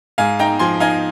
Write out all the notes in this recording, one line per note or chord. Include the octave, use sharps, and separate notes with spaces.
G#2 F5 G#5
D#4 G5 A#5
F3 G#5 C6
D#4 F5 G#5